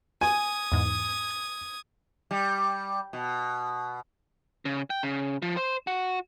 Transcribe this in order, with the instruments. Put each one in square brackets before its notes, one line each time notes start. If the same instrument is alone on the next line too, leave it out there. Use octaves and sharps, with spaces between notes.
[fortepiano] G#5 [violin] D#6 G#6
[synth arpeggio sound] E2 G#2
[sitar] G3
B2
[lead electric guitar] C#3
G5
C#3
F3
C5
F#4